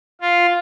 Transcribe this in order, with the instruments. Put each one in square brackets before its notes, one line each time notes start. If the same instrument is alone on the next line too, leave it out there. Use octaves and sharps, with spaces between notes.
[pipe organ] F4